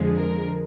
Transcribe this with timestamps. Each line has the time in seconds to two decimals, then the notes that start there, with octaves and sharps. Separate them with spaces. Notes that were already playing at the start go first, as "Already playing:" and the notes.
Already playing: F2 D3 F3 G#3
0.17 A#4